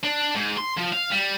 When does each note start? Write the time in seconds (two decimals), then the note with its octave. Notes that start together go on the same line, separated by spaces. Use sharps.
0.03 D4
0.34 G#2
0.57 C6
0.77 F3
0.92 F5
1.11 G3